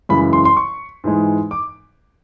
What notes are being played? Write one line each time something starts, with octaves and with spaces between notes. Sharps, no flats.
F#2 C#3 E3 G#3 B5
C6
C6
C#6
G#2 E3 G#3
D6